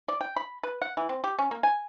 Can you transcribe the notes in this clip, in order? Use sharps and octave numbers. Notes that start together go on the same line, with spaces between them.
D5
G5
B5
B4
F#5
E3
C4
G4
C#4
A#3
G#5